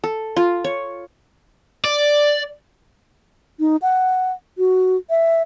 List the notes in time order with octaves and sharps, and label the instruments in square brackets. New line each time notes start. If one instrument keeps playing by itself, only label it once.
[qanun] A4
F4
C#5
[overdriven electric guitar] D5
[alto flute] D#4
F#5
F#4
E5